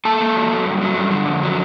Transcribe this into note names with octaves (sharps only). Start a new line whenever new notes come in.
A#3 A4 A5
A#3
F#3
F#3
G2
F#3
G2
D3
F2
F#3